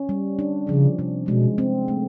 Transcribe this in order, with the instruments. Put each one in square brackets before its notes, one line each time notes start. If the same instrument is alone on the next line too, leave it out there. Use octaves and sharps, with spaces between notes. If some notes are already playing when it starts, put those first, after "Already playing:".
Already playing: [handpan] C#4
G3
D4
[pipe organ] C#3 [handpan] F3
[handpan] C3
[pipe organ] B2 [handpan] G#3
[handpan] C4
A3